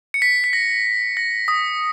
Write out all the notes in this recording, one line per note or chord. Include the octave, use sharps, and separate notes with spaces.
C#7
B6
B6
A#6
A#6
D#6